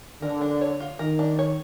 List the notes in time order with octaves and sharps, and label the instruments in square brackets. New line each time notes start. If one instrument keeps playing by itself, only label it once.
[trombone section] D3 [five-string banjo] A#4
[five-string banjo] D4
C#5
F4
[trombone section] D#3 [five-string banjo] A#4
[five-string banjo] D4
C#5